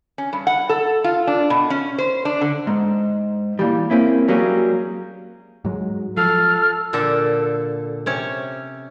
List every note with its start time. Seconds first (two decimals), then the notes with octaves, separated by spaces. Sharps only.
0.18 C#4
0.33 G2
0.47 F#5
0.69 A4
1.04 F4
1.27 D4
1.50 B2
1.70 C#4
1.98 C5
2.25 D4
2.41 D3
2.67 G#2
3.59 A#2 E3 G3
3.90 A#3 C4 C#4 E4
4.28 F#3 G3 A#3 C#4 G4 G#4
5.65 G#2 F#3 G#3
6.17 F3 A4 F6
6.93 A#2 D3 A4
8.06 C3 C#4 C#5